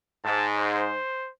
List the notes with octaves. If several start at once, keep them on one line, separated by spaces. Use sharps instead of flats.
G#2 A5
C5